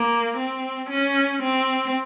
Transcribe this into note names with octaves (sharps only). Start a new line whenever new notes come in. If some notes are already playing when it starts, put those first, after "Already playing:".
Already playing: A#3
C4
C#4
C4